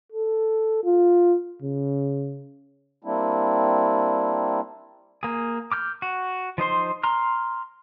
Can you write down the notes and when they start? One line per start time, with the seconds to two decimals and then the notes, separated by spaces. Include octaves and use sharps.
0.12 A4
0.84 F4
1.63 C#3
3.04 G3 A#3 C4 D4 E4
5.23 A#3 G#4
5.72 D6 F6 G6
6.02 F#4
6.58 F3 D#4 C5 C6
7.03 A#5 C6 F6